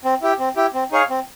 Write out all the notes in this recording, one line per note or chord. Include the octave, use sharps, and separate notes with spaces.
C4
E4 G4
C4
E4 G4
C4
D#4 G#4 C#5 F5
C4